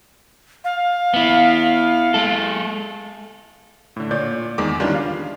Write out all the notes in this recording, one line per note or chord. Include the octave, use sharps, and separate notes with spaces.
F5
B3 E4
G#3 A4
A2 D3
A#2 C#5 D5 G6
E2 D#3 G#3 D6
D#3 E3 G3 C#4 D4 F4
F5